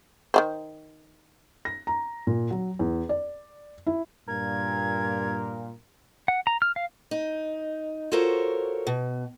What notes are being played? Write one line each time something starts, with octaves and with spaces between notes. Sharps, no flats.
D#3 G3 C5
A#6
A#5
A#2
F#3
E2
D5
E4
G2 A#2 A#4 G#6
F#5
A#5
F6
F5
D#4
F4 F#4 A4 A#4 C5 C#5
B2